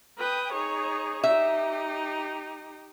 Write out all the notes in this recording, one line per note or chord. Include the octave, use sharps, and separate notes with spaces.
B4 G5 D#6
D#4 G#4 C#5
D#4 G4 E5